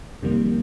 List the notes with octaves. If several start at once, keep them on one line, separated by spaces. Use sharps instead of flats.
F2 C3 D#3 G3 A#3